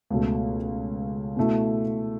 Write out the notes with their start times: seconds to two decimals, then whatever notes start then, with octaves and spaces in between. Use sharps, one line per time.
0.10 C#2 B2 A3
1.37 B2 A3 E4